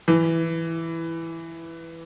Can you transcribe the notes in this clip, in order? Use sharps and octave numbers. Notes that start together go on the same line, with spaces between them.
E3